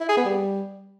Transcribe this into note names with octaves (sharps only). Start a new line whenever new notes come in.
E4
G#4
B3
G3